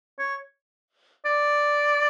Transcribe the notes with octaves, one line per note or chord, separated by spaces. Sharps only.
C#5
D5